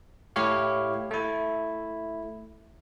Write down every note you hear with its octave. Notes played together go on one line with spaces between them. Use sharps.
A2 E4 G4 C#5 F5
A3 E4